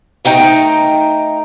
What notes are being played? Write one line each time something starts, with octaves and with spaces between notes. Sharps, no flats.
A3 D#4 G5 G#5 A#5